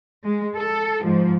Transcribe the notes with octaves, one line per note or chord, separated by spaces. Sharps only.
G#3
A4
G#2 F3